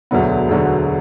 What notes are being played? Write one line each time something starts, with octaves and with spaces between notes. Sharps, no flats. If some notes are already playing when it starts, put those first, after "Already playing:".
E1 D2 D3 F#3 B3
E1 D2 D3 F#3